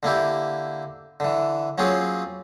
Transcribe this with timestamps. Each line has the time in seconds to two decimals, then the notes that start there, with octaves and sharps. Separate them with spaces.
0.03 D3 A#3 E4 G4
1.20 D3 E3
1.78 F#3 A#3 C4 C#4 F4 G#4